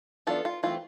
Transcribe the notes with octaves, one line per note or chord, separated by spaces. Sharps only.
E3 B3 D4 F4 A4
F4
E3 A3 C4 F4